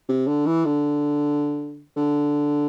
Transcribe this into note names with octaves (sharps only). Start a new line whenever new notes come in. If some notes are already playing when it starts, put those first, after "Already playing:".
C3
D3
E3
D3
D3